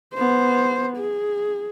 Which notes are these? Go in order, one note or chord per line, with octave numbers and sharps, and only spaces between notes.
B3 C5
G#4